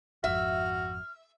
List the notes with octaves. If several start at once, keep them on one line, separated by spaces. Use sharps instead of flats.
G#1 F2 F#4 E5 F6